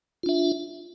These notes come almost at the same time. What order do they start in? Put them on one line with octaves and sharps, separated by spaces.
F4 D4 E5